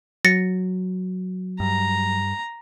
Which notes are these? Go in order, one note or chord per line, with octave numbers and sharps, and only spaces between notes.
F#3 A6 A#6 C#7
G2 A#5